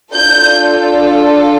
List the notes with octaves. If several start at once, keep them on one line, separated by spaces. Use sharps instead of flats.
D4 F4 A4 G6